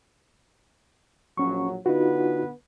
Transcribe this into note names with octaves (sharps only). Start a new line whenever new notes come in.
A#1 F#3 C#4 C#6
D3 B3 D#4 F4 F#4 B4